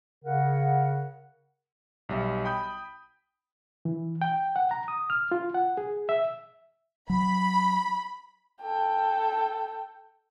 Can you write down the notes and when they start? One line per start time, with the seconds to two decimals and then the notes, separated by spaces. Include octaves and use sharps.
0.24 C#3 A#4 F#5
2.09 B1 G3 E5
2.45 G5 B5 D#6 G6
3.85 E3
4.22 G5
4.56 F#5
4.71 A#5
4.88 D#6
5.10 F6
5.32 F4
5.54 F#5
5.77 G#4
6.09 E5
7.10 F#3 B5
8.61 A4 G5